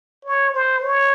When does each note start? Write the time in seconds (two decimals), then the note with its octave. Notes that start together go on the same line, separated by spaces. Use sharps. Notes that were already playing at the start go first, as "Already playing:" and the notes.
0.25 C#5
0.54 C5
0.83 C#5